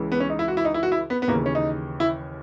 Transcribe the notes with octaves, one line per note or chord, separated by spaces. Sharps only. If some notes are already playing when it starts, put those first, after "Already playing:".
Already playing: C#2 C#3 E3
B3
C#4
D#4
E4
F#4
E4
D#4
E4
F#4
E4
B3
B3
D#2 C#3 E3 A#3
C#4
D#4
E4